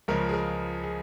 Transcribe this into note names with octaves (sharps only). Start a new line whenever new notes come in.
C#2 C#3 F3 G#3 A#4
G#4
A#4
G#4